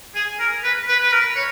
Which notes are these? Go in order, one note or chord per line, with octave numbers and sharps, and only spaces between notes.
G#4
A#4
B4
B4
B4
A#4
C#5